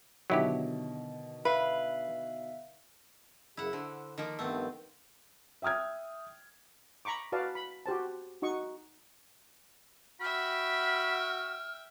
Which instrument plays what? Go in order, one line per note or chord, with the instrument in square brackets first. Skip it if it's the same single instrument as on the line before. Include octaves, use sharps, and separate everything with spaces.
[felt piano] B2 D3 D#3 [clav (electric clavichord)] F#3 E4 G4
[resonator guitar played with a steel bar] B4 [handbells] E5 F5
[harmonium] F#2 C#3 [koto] E4 F#5
[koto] D3 [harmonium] C5
[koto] D#3 F3 A#3
[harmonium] G2 D#3 B3 [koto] A3 C4
[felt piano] E5 G5 D#6 F6 G#6
[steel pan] A#5 B5 C#6 D6
F#4 B4 D5 F5 A5
B5
F#4 G4 C5 A5
D#4 F#4 D#5 C#6
[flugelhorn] F#4 [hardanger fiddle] E5 G5 [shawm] B5 [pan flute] F6